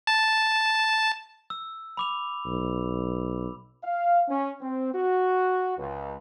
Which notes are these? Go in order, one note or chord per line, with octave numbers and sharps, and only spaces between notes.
A5
E6
B5 D6 F7
B1
F5
C#4
C4
F#4
C#2